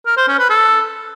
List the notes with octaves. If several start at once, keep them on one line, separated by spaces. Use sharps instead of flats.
A#4
C5
C#4
B4
A4